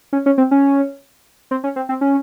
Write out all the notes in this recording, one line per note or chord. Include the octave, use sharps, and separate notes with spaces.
C#4
C#4
C4
C#4
C4
C#4
C4
C4
C#4